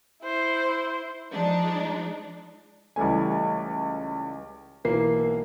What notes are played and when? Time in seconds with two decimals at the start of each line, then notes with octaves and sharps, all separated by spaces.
0.23 E4 C5
1.31 F3 G#3 D4 D#4
2.96 C#2 E3 G3 A3 G#5
4.84 B1 E3 A#3 C7